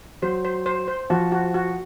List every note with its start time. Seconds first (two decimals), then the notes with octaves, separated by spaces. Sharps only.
0.22 F#3 C5
0.45 C5
0.66 C5
0.88 C5
1.10 F3 F#4
1.32 F#4
1.54 F#4